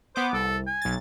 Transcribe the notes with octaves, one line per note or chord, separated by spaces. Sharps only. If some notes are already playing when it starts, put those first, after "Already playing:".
B3 C5 D6
C2 A4
G#5
B1 A6